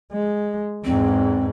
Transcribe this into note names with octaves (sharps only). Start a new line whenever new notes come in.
G#3
E2 G#2 C4